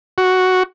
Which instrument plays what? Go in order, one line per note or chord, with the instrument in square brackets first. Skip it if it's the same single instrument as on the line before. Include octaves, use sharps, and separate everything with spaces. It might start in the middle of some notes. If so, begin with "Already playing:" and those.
[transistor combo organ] F#4